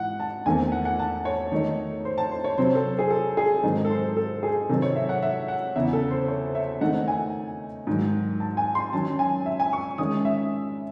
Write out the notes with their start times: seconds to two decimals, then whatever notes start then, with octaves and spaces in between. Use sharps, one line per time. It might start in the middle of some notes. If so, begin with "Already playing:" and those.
Already playing: G#2 E3 F#5
0.20 A5
0.46 E2 D#3 A3 C4 G#5
0.72 F#5
0.85 F#5
0.99 A5
1.25 C#5
1.52 D#3 A3 D#4
2.05 C5
2.18 A5
2.31 C5
2.44 C#5
2.58 C3 F#3 C4 C5
2.75 A4
2.99 G#4
3.10 A4
3.37 G#4
3.63 G#2 D#3 F#3 C4 D#4
3.85 A4
3.90 C5
4.17 A4
4.43 G#4
4.69 C3 D#3 F#3 C4 D#4 A4
4.82 C#5
4.96 E5
5.09 F#5
5.23 E5
5.48 F#5
5.76 E2 C#3 E3 E5
5.93 A4
6.11 C5
6.28 C#5
6.55 E5
6.81 D#3 A3 C4 D#4 F#5
7.08 G#5
7.87 G#2 D#3 F#3
8.40 A5
8.57 G#5
8.75 C6
8.93 D#3 F#3 C#4 A5
9.19 G#5
9.46 E5
9.60 G#5
9.73 C#6
9.98 D#3 G#3 C#4 D#6
10.25 E5